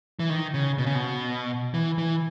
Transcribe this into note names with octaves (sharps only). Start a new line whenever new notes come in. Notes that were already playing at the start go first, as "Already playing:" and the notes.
E3
D#3
C#3
B2
C#3
B2
E3
E3